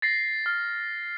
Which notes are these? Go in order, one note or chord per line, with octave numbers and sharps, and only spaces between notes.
A6 A#6 C7
F6